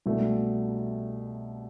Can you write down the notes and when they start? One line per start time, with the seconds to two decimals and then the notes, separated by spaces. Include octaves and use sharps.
0.06 C2 B2 A3 D4